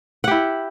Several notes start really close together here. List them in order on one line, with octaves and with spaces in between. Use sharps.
F#5 G4 E4